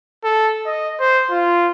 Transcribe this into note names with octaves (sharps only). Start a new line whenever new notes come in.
A4
D#5
C5
F4